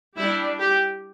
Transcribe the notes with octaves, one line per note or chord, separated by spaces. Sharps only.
G3 D4 E4
G4